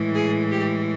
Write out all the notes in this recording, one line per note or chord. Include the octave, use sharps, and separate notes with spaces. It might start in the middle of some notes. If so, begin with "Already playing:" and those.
Already playing: A2 E3 G#3
G#4
G4